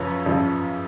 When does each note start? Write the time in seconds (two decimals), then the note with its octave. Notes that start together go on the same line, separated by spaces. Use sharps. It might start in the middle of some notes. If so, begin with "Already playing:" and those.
Already playing: F#2 C#3 F3 B4 C#5
0.26 F#2 C#3 F3